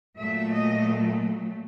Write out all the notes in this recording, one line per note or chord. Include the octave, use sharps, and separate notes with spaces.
A#2 F#3 A3 E5
D#5